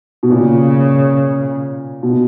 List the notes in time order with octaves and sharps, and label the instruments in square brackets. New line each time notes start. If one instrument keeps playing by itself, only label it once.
[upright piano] B2
[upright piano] A#2 [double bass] C#3
[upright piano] B2